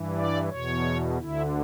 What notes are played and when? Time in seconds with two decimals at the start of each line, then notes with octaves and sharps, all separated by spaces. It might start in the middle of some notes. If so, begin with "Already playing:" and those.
Already playing: G2 E3
0.15 D5
0.49 E2 B2 C#5
1.18 D2 D3 E4